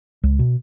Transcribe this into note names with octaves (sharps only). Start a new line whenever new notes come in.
C#2
B2